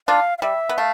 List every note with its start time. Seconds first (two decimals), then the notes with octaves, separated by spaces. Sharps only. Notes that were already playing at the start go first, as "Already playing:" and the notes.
0.08 D4 F4 F5
0.38 F5
0.42 G3 E5
0.69 B3
0.78 A3 F5